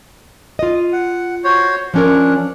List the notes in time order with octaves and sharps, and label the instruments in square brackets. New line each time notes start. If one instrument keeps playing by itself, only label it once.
[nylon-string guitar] F4 D#5
[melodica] F#5
F#4 C5 C#5
[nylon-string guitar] F3 C#4 A#4 [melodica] D4